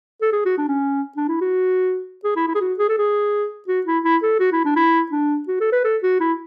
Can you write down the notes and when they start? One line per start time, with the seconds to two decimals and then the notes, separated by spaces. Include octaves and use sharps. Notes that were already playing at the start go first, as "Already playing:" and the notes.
0.22 A4
0.32 G#4
0.46 F#4
0.58 D4
0.68 C#4
1.17 D4
1.28 E4
1.41 F#4
2.24 G#4
2.36 E4
2.48 E4
2.55 G#4
2.61 F#4
2.79 G#4
2.89 A4
2.98 G#4
3.68 F#4
3.86 E4
4.04 E4
4.23 A4
4.40 F#4
4.52 E4
4.65 D4
4.76 E4
5.12 D4
5.48 F#4
5.60 A4
5.72 B4
5.84 A4
6.03 F#4
6.20 E4